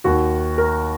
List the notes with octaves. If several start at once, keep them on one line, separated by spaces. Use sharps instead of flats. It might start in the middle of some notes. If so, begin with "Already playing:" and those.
D#2 D#3 F#4
A#4